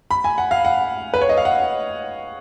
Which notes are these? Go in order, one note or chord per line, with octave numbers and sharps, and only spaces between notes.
B5
G#5
F#5
F5
F#5
B4
C#5
D#5
F5
F#5